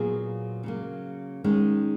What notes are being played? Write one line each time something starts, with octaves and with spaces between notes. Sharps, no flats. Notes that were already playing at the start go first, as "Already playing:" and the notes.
Already playing: A#2 F#3 B3 F4 G#4
C#3 F#3 A#3
D#3 G#3 C#4